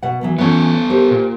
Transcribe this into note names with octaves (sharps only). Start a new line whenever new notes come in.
B2 F#5
E3 F#3 B3
E3 B3 C#4 F4 A4
G4 A#4 C5
A#2